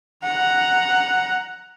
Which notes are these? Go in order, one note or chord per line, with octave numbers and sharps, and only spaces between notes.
F#5 A#5